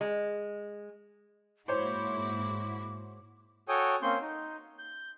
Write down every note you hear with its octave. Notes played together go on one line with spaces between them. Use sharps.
G#3
G#2 A#3 E4 F#4 C5 C#5 D6
F#4 A4 C#5 G5 G#5 D#6
A#3 C4 C#4 C6 G6
D#4
G6